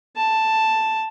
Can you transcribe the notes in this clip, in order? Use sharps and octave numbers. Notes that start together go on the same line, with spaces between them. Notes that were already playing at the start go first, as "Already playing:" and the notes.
A5